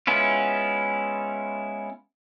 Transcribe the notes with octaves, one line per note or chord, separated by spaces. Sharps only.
G#3 B3 C#4 E4 F4